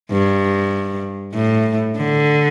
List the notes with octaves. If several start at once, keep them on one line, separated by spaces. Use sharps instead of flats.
G2
A2
D3